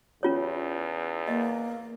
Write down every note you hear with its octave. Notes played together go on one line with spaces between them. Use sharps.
E2 C#4 F4 C#5
A#3 D#5